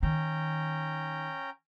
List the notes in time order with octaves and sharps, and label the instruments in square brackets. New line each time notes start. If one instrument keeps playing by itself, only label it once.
[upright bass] D#3 [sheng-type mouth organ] C#4 G5 A#5